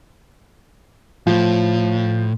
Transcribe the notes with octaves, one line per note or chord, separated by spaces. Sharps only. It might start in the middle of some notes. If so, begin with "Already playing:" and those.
A2 F3